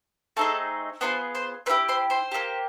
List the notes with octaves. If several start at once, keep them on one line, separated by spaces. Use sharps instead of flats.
A3 C4 D#4 G#4 A4 A5
B3 D4 F4 G#4 C5 C6
C5 C6
C4 E4 G4 B4 B5
C5 C6
C5 C6
A#3 D#4 G4